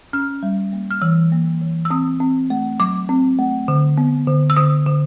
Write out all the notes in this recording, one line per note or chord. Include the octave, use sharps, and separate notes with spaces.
C#4 F6
G3
A#3
F6
E3 E6
A#3
E3
E6
C4 D#6
C4
A3
F#3 D6
C4
A3
D3
B3
D3
E6
D3 D#6
D3